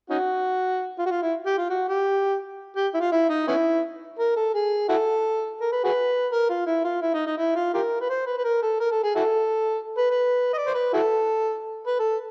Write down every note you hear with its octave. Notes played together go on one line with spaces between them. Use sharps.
C#4 D#4 F#4
F4
F#4
F4
E4
G4
F4
F#4
G4
G4
E4
F4
E4
D#4
B3 C#4 E4
A#4
A4
G#4
E4 F#4 A4
A#4
B4
F#4 G#4 B4
A#4
F4
E4
F4
E4
D#4
D#4
E4
F4
F4 G4 A#4
B4
C5
B4
B4
A#4
A4
A#4
A4
G#4
E4 F#4 A4
B4
B4
D#5
D5
C5
B4
E4 F#4 A4
B4
A4